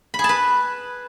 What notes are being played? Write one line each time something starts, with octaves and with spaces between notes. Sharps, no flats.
B5
G#4
A5
B4